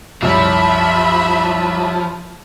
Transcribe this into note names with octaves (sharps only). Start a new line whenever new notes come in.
C2 F#2 F3 E5 B5